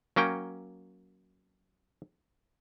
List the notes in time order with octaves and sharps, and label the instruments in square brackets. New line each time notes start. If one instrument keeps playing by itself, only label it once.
[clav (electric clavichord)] F#3 A#3 C#4 G5